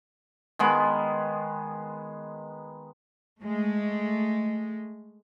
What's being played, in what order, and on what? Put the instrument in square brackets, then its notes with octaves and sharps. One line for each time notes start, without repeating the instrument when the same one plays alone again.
[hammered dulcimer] D#3 G#3 B3
[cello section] G#3 A3